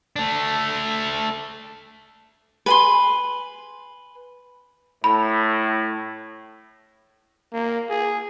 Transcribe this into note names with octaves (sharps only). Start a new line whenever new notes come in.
A3 D4
B4 G#5 C6
A2 B5
A#3
G#4